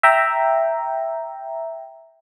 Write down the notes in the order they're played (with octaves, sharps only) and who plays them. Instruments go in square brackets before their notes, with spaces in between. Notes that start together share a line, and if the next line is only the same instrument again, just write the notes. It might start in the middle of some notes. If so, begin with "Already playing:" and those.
[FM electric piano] E5 G5 A#5